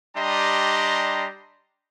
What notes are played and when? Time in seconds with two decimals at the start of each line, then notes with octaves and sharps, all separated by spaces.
0.17 G3 D4 G4 D#5 A#5 C6